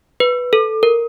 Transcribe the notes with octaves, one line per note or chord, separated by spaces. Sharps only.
B4
A4
A#4